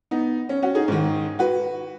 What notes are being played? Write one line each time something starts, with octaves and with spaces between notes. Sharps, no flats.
B3 D#4
C#4
C#4 F#4
D#4 G#4
G#2 D#3
F#4 B4